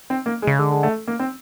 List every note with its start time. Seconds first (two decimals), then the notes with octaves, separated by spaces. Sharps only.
0.10 C4
0.26 A#3
0.42 G#3
0.47 C#3
0.59 D3 G#3
0.71 G#3
0.83 A3
1.08 A#3
1.19 C4